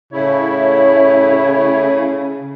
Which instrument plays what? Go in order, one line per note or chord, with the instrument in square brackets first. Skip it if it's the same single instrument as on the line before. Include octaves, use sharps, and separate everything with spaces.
[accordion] A2 E4 [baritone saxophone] C#3 [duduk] C#5